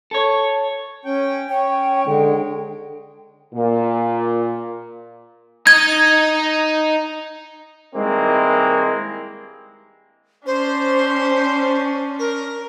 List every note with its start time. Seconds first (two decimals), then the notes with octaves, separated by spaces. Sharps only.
0.11 A4 C#5
1.05 C#4 G5
1.49 C#4 C#5 G5
2.06 D3 G#3
3.54 A#2
5.67 D#4 D#5 G#6
7.95 G2 D#3 G#3 A#3 C4 E4
10.46 C#4 D4 C5
12.19 A#4